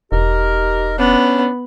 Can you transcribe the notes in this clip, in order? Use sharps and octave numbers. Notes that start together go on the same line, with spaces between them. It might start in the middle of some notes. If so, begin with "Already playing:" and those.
E1 D#4 G4 A#4
B3 C#4 D4